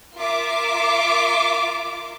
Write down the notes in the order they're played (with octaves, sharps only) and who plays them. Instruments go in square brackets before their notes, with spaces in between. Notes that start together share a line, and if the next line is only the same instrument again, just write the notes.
[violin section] F4 A#4 E5 D6